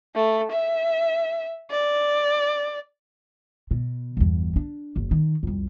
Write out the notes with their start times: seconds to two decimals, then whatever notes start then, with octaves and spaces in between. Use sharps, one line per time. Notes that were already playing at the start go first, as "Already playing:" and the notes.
0.15 A3
0.52 E5
1.71 D5
3.71 B2
4.17 G1 E2
4.56 D4
4.96 F#1
5.11 D#3
5.43 C2 F2